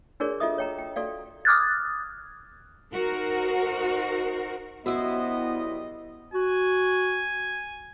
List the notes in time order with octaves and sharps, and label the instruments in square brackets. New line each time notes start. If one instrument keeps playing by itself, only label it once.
[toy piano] D4 F#4 G#4 A#4 C#5 D5
F4 A4 D#5 E5 D#6
C#5 G5 A#5
G5
F#4 A4 D5 F5
[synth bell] D6 D#6 F6 F#6 G#6 A6
[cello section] D#4 F#4 A#4 C5
[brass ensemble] F#2 G3 D#5 [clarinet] B3 [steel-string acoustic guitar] E4 C5 [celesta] F#4 E6
[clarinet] F#4 [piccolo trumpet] G#5